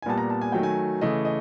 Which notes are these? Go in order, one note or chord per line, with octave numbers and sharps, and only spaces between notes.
G#5
A#2 G3 B3 A5
A#5
A5
G#5
D#3 F#3 A3 G5
G#5
C#3 E3 A3 D#5
D#5